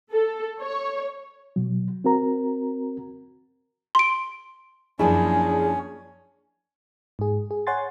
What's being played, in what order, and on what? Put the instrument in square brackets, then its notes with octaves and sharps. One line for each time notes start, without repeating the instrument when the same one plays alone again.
[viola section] A4
C#5
[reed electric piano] B2 F#3
C4 F#4 A#4 A#5
[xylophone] C6 D7
[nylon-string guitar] F#2 F3 E4 [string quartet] A#3 D4 [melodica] C#4 C#5 [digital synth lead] G#4
[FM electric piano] G#2 G#4
G#4
C#5 F#5 G#5 C6 A6